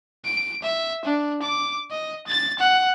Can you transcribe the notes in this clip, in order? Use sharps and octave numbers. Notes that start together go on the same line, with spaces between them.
D7
E5
D4
D6
D#5
A6
F#5